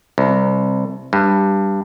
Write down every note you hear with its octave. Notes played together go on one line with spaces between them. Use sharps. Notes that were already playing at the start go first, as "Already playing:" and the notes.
C2
G2